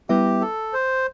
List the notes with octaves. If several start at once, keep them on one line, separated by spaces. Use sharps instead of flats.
G3 B3 E4 G4 B4 E5
A4
C5